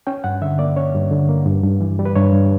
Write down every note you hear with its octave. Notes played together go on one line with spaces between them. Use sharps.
C#4 G5
G2 F#5
D3 E5
A#3 D5
C#4 C#5
G2
D3
A#3
G2
G2
E3
G3
B4
G2 C#5
G2